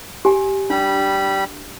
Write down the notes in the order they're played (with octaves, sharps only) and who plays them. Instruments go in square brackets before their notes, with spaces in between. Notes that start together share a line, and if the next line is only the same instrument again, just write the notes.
[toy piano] G4 G#5
[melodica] G3 B5 [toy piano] D4